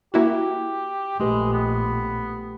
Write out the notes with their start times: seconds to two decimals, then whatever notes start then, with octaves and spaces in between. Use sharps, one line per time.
0.14 A#3 E4 F#4 G4
1.20 A#1 G#3 A3 G4 B4
1.53 B3